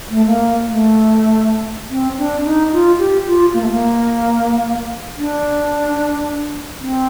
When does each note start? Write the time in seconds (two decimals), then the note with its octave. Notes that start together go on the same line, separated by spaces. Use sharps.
0.10 A3
0.26 A#3
0.67 A3
1.90 C4
2.18 D4
2.44 D#4
2.72 F4
2.99 G4
3.27 F4
3.54 A#3
3.62 A3
3.69 A#3
5.17 D4
6.80 C4